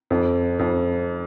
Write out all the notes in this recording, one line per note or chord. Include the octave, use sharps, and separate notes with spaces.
F2
F2